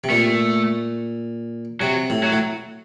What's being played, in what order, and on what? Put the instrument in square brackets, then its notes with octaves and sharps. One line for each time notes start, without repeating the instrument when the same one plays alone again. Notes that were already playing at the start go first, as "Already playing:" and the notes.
[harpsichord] C3
[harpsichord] A#2 [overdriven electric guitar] A3
[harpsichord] C3 [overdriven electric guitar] F#3
[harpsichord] A2
[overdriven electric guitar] F#3
[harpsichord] A2